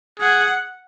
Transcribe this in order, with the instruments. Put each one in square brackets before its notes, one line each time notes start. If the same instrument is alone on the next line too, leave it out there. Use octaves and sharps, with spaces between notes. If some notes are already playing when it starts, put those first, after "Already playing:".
[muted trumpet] G#4 [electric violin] F#5